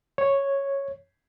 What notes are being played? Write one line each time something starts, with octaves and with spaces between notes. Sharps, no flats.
C#5